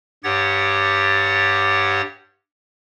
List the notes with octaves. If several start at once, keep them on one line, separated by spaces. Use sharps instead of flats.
G2 G4 C#5 F#5 A6